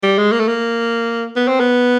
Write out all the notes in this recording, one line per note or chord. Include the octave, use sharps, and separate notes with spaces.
G3
G#3
A#3
A3
A#3
B3
C4
B3